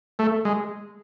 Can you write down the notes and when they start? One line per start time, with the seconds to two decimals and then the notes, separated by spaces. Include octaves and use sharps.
0.19 A3
0.45 G#3